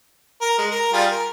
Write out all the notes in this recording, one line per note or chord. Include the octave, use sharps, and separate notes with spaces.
A#4
G#3
A#4
G3 F4 G#4
A#4